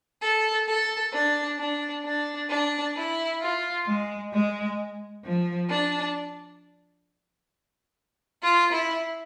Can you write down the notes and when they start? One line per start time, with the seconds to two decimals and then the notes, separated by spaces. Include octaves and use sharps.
0.22 A4
0.68 A4
1.14 D4
1.59 D4
2.05 D4
2.50 D4
2.96 E4
3.41 F4
3.86 G#3
4.33 G#3
5.24 F3
5.70 D4
8.42 F4
8.73 E4